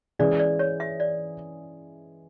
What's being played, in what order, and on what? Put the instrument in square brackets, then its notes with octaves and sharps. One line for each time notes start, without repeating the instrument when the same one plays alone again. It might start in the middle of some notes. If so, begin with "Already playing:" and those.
[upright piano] E3 G#3 C#4 G#4 [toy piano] D5
[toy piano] D5
C#5
E5
D5